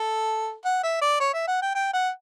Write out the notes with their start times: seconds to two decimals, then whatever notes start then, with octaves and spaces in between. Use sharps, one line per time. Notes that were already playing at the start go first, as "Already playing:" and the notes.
Already playing: A4
0.65 F#5
0.83 E5
1.01 D5
1.20 C#5
1.34 E5
1.48 F#5
1.62 G5
1.75 G5
1.93 F#5